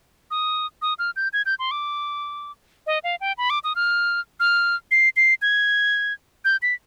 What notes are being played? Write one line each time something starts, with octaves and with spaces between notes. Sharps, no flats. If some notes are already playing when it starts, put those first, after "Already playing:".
D#6
D#6
F6
G6
G#6
G6
C6
D6
D#5
F5
G5
B5
D6
D#6
F6
F6
C7
C7
G#6
G6
B6